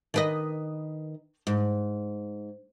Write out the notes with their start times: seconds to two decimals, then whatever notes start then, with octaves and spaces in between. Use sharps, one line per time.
0.14 D#3 B4 D#5
1.47 G#2